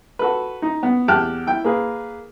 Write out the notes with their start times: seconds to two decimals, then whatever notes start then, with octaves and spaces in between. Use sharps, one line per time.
0.19 F#4 A4 B4
0.62 D#4
0.83 B3
1.08 E2 G4 G5 A5 F6 F#6
1.47 E4 G5
1.64 A#3 G#4 B4